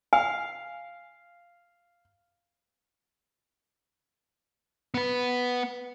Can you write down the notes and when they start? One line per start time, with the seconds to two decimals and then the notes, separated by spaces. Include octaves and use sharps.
0.13 F5 G#5
4.94 B3 B4